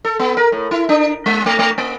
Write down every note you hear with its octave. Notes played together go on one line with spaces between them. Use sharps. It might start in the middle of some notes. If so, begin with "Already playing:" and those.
A4
B3
A#4
A2
E4
D4
G#3
A3
A3
A#3